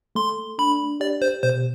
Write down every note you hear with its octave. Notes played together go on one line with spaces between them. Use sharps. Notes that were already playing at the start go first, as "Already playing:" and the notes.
A3 C6
D4 B5
G4 D5
C5
B2 C5